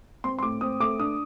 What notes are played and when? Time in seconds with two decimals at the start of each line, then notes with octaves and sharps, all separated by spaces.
0.24 C4 C6
0.39 C6
0.43 A2 D6
0.61 C4 D#6
0.80 A3 D6
0.99 D4 D#6